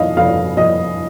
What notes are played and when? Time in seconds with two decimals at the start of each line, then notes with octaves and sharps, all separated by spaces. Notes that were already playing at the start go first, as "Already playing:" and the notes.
Already playing: F2 D#3 D#5 F5
0.17 F2 F5
0.57 F2 D#5